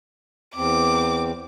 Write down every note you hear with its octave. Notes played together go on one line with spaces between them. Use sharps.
E2 C4 D6